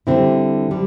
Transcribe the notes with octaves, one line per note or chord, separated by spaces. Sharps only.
D3 G3 C4 E4
D3 G3